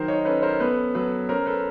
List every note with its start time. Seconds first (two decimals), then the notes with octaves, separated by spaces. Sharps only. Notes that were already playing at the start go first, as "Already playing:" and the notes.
Already playing: D#3 F#3 A#4 C5
0.08 C#5 D#5
0.25 C#4 A4 B4
0.42 A#4 C5
0.60 B3 A4 B4
0.95 F#3 A4 B4
1.29 C#4 A#4 C5
1.46 A4 B4